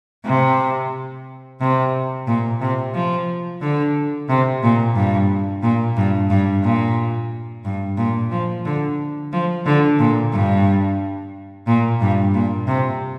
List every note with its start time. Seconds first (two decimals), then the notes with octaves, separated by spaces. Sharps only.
0.26 C3
1.61 C3
2.27 A#2
2.61 C3
2.94 F3
3.61 D3
4.29 C3
4.63 A#2
4.96 G2
5.63 A#2
5.97 G2
6.30 G2
6.64 A#2
7.65 G2
7.97 A#2
8.31 F3
8.65 D3
9.33 F3
9.66 D3
10.00 A#2
10.33 G2
11.67 A#2
12.01 G2
12.34 A#2
12.67 C3